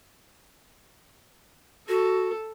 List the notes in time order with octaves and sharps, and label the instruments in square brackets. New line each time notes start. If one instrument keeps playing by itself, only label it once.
[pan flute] F#4 [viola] A4